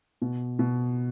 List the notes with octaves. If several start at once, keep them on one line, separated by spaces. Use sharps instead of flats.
B2
B2